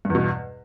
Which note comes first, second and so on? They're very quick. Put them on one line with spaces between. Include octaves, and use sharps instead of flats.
G2 E2 B2